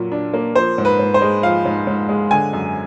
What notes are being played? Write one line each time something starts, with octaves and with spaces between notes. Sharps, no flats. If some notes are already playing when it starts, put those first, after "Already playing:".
Already playing: A#2 F#3 A#3
D4
A#3
F3 C5
G#2
B4
G#2
C5
G#3
F3 F5
G#2
G#2
G#3
D3 G#5
F#2